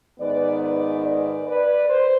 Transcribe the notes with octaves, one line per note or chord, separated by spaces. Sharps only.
G#2 D#3 B3 B4 D5
B4 D5
B4 D5
B4 D5
C5